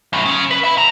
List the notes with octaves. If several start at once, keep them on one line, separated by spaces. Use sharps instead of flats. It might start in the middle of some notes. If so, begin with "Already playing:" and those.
F#2 B2
C#3
B4
E5 B5
C2 A#5